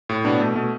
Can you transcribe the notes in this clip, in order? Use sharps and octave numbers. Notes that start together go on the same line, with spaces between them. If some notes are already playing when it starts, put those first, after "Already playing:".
A2
B2 B3 D4
B2 A3
B2 A3